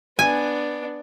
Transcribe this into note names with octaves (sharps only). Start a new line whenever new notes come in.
B3 D4 G#5